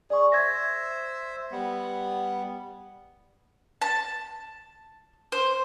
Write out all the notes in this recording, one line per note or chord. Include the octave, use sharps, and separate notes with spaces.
G#4 D5 C#6
C5 E5 G#6 A#6
G3 B3
A5
C5